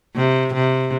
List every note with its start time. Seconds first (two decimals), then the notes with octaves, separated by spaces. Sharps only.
0.16 C3
0.54 C3